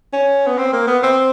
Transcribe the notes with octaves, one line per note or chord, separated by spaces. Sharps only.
C#4
B3
C4
A#3
B3
C4